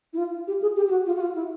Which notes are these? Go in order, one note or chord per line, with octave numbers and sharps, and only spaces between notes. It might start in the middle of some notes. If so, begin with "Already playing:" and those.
E4
F4
G4
G#4
G4
G4
F#4
F4
F#4
F4
E4